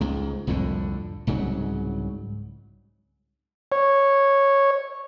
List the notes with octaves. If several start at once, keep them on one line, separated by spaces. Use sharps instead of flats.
C#2 G#2
C2 F2 A2 D3
C2 G#2 C#3 F#3
C#5